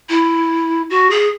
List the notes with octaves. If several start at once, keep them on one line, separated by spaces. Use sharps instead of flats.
E4
F#4
G#4